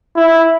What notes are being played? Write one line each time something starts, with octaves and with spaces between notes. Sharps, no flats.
E4